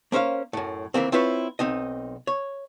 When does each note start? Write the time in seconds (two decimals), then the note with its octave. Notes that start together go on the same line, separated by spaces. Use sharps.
0.12 A#3 C#4 C5 E5 F5
0.53 F#2 A2
0.94 D#3 E3 A#3 C4
1.12 C4 E4 F4 B4 C#5
1.59 B1 C4 D#4 D#5
2.27 C#5